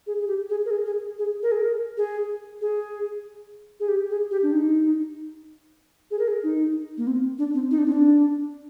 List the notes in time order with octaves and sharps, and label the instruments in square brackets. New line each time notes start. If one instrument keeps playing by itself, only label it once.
[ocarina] G#4
G#4
G4
G#4
A#4
G#4
G#4
G#4
A#4
G#4
A#4
G#4
G#4
G#4
G4
G#4
G4
D4
D#4
G#4
A#4
G#4
D#4
A#3
C4
D4
C4
D#4
D4
C4
D4